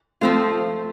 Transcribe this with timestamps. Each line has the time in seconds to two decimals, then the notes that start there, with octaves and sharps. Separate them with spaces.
0.21 F3 A3 C4 F4